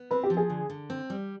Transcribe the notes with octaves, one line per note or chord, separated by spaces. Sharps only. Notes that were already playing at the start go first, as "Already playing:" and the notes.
Already playing: B3
C4 B4
G4
F3
G#4
D3
D3
C4
G3